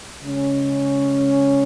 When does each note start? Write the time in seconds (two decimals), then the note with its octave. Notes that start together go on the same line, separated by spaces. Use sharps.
0.22 C#3 G#3 C#4